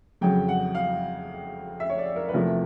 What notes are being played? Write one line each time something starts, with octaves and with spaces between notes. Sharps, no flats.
F2 C#3 F#3 G5
F#5
F5
E5
C#5
D5
A#4
B4
E2 C3 F3 A3 A#4